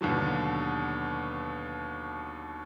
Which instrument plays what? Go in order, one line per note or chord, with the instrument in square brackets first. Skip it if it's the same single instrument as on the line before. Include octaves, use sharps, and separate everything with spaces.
[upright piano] D#2 B2 D3 F#3